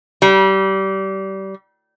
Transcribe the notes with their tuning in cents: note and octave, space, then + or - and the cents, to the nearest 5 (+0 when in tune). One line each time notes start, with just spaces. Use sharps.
G3 -25